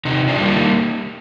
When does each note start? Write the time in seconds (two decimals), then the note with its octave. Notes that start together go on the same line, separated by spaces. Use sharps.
0.05 C3 D#4
0.28 D4 F4
0.39 G3 A#3
0.50 D#4